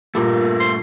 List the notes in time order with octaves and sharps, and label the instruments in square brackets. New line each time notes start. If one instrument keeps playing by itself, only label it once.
[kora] G2 A#2 [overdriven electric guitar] A3 A#4
[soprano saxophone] C6